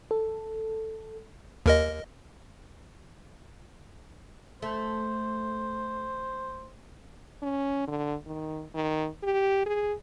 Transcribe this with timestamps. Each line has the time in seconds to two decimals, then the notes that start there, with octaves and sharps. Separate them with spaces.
0.11 A4
1.66 D#2 A#4 D#5
4.62 A3 C5
7.42 C#4
7.87 D3
8.26 D#3
8.74 D#3
9.23 G4
9.66 G#4